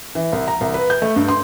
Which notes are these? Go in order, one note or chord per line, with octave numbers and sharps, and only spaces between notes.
E3
C2
A#5
C2
B4
G6
A3
G2
C6